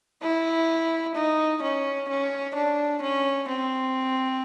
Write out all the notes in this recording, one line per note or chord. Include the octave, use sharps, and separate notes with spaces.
E4
D#4
C#4
C#4
D4
C#4
C4